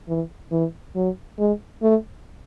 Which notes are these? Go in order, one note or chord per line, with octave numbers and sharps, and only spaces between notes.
E3
E3
F#3
G#3
A3